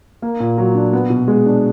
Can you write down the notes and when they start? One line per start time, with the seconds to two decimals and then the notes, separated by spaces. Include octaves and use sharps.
0.22 A#3
0.40 A#2
0.58 F#3
0.75 D4
0.93 B3
1.10 B2
1.28 G#3
1.46 D4